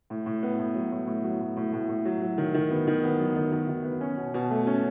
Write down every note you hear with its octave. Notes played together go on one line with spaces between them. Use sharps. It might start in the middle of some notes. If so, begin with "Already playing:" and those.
A2
A2
B3
A2
F#3
A2
A2
F#3
A2
A2
A2
A2
F#3
F#3
D#3
D#3
B3
D#3
B3
F#3
D#3
D#3
D#3
B3
C#4
B2
B2
A3
C#4